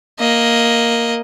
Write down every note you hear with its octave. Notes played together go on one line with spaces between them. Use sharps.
A#3 D#5